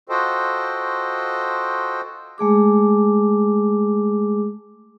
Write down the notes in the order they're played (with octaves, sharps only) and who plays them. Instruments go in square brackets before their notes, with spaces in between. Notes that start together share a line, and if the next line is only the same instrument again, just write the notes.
[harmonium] F4 F#4 A4 C5 D#5 G5
[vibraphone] G#3 A3 G#4 D6